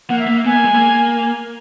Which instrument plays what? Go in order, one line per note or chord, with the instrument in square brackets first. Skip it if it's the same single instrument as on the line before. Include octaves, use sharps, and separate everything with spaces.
[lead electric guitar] A#3 [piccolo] F#5
[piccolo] E5
[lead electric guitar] A#3
[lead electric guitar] B3 [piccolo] G#5
[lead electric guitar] A#3
G#3
A#3